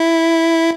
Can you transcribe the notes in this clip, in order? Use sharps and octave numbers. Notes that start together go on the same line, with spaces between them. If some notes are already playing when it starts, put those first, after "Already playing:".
Already playing: E4